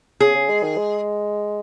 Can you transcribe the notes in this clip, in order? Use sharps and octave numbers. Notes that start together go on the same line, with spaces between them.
C#3 G#4
C#3
G#3
D#3
G#3